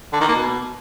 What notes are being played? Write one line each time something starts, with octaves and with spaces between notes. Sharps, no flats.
D3
D#3
A#3
B2